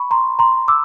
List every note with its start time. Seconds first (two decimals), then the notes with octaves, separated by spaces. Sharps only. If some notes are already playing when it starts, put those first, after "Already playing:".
Already playing: B5 C#6
0.11 A#5 C6
0.39 A#5 C6
0.68 D6 E6